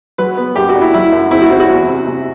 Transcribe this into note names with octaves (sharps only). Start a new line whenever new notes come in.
F#3 B4
B3
F#2 G4
F#4
D4
E4
F#3 E4
F#2
C4 E4
F#4
C4 E4
F#4
E2
C3
C3